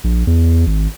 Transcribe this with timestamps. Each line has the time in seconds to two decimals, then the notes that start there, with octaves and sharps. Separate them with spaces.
0.04 A#1
0.27 E2
0.67 G#1